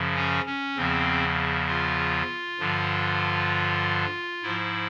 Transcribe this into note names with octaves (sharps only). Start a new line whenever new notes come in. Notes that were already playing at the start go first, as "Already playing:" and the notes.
Already playing: F#2 C#3 F3
C#4
C#4
E2 C#3 F3 C4
F4
G2 D3 F3
G#2 F3 E4